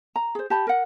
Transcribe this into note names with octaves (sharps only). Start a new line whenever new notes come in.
A#5
G#4 C5
G4 A5 B5
A#4 F#5